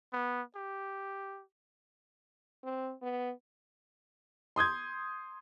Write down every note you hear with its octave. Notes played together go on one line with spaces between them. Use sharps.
B3
G4
C4
B3
C6 D#6 G6 G#6